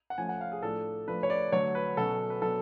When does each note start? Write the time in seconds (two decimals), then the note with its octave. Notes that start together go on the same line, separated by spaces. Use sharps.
0.10 F#5
0.18 F3 A3 C#4 G#5
0.29 F#5
0.41 F5
0.52 G#4
0.63 A2 F3 A3 D4 A4
1.08 F3 A3 D4 B4
1.23 C#5
1.30 D5
1.52 D3 F#3 A3 C#5
1.75 B4
1.97 B2 F#3 C#4 A4
2.30 B4
2.42 B2 F#3 B3 D4 A4